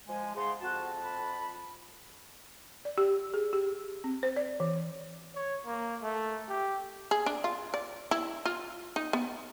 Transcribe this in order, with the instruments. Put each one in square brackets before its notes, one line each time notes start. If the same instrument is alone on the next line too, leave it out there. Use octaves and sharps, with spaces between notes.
[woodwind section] F3 G#3 [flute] G#5
[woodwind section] G#2 C#3 [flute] C6
[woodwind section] F2 A5 [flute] F#4
[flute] B5
[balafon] D5
G4
G#4
G4
C4
C5
D5
E3
[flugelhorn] C#5
A#3
A3
G4
[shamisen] G#4
D4
F4
D5
E4
F4
D#4
B3